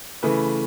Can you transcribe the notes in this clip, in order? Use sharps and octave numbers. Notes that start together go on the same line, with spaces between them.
C#3 E3 A3 B4